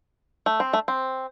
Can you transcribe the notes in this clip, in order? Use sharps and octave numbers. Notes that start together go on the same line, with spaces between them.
A3
C4
A3
C4